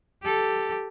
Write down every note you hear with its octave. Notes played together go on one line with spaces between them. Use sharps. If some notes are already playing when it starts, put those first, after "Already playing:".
G4 A4